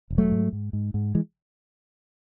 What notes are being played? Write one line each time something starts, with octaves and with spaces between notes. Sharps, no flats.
E1
F#3 A3
G#2
G#2
G#2
G#2
E3 G#3